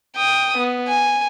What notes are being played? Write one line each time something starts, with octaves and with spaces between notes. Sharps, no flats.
G5 D#6
B3
G#5